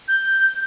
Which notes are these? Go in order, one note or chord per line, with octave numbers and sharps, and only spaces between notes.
G6